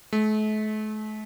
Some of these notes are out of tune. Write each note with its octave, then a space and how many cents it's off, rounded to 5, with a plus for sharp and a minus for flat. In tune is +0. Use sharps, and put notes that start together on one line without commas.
A3 -40